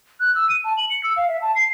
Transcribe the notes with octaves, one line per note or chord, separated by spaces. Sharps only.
F#6
E6
D#7
A5
F#7
C#7
E6
F5
E5
A5
C7